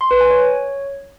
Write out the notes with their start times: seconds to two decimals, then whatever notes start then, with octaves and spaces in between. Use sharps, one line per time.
0.01 C6
0.11 B4
0.21 G#5
0.31 C#5